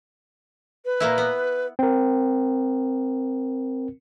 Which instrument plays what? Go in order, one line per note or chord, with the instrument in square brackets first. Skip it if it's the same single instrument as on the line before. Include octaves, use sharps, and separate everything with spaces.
[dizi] B4
[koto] A#2 A#3 E4
B3
[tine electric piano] C4 A#4